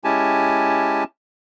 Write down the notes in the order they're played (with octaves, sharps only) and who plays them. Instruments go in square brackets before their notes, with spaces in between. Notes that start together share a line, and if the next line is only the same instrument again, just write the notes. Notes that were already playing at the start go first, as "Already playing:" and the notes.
[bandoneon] G#3 C#4 E4 G4 G#5 A5